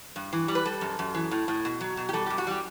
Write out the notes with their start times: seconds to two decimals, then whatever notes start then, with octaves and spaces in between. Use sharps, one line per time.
0.16 G2
0.33 E3
0.48 G3
0.55 B4
0.65 G3 A4
0.81 F#2
0.99 F#2
1.15 E3
1.31 A2
1.48 A2
1.65 B2
1.81 F#3
1.97 B2
2.09 G4
2.13 G3 A4
2.26 G4
2.30 F#2
2.38 F#4
2.47 G3 G4